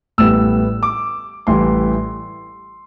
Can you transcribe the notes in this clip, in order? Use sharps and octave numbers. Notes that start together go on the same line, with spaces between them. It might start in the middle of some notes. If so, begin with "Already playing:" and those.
A1 A2 G3 B3 E6
D6
A1 A2 E3 G3 C6